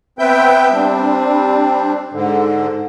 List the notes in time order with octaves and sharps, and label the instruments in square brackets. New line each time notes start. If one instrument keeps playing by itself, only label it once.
[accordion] B3 C4 B4 E5 G5 G6
G3 C4 D4
G#2 D3